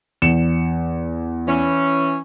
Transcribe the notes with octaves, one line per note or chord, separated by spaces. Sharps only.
E2 C#7 E7
E3 C#4